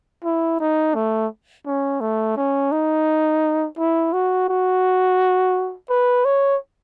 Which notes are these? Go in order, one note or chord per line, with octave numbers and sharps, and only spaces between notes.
E4
D#4
A3
C#4
A3
C#4
D#4
E4
F#4
F#4
B4
C#5